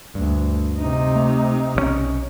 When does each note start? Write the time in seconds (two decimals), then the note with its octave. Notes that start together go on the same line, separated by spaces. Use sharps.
0.15 D2 G2
0.79 C3 D#4
1.16 A3
1.75 B1 D#3 C#4